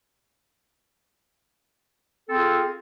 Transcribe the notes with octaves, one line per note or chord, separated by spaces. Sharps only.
C4 F4 G#4 A4